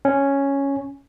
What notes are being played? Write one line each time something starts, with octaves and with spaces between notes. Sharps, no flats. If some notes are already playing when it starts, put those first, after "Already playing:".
C#4